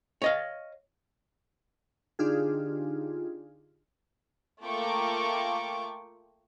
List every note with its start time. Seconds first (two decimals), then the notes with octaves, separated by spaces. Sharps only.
0.22 C#5 D#5 F5
2.19 D3 D4 D#4 F4 G4 G#4
4.63 A3 A#3 F4 G5 C#6 D6